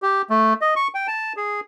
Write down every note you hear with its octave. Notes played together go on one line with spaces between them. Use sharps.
G4
A3
D#5
C#6
G5
A5
G#4